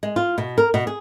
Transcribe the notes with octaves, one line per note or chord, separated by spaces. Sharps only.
G#3
F4
B2
A#4
B2
G#4